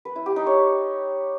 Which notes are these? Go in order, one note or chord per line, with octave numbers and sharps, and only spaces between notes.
B4
E4
G4
D#4
C#5